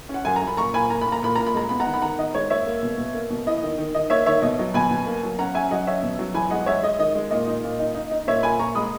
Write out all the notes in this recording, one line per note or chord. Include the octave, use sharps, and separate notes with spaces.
C#4 F#5
F#2 G#5
A#5
F#2
B5
A#2 A#5 C#6
A#2 G#5 B5
A#2 A#5
B5
A#2
A#5
A#2 B5
A#2 A#5
B5
G#3 A#5
B3 B5
F#5 A#5
D#3
B5
D#3 F#5 A#5
D#3 D#5
G#3 C#5
A#3 C#5 E5
A#3
B2
B2
A#3
B2
E4 D#5
D#3
D#3
D#3 D#5
A#3 C#5 E5
D#3 C#5 E5
B2 D#5
F#3
B2 G#5 B5
B2
A#3
F#3
C#4 F#5 A#5
C#4 E5 G#5
F#3 D#5 F#5
C#4 C#5 E5
B2
F#3
E2 G#5 B5
G#3 D#5 F#5
G#3 C#5 E5
G#3 D#5
D#3 D#5
G#3
A#2 D#5
D#4
A#2
D#4
D#4
D#4
A#2 C#5 E5
A#2 G#5 B5
A#2 A#5 C#6
G#3 B5 D#6